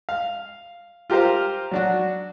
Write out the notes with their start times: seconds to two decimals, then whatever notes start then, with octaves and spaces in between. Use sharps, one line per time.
0.09 F5
1.10 F4 G4 A#4 C5 F5
1.71 F#3 D4 F#4